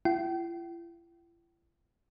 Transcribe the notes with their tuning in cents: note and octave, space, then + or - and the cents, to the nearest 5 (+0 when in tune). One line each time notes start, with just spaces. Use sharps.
E4 +45 G5 -40